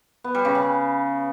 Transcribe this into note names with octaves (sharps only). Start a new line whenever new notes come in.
B3
G3
C#3
C#3